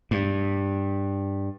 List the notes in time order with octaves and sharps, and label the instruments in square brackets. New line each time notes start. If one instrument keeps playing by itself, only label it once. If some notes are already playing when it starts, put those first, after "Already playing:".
[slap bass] G2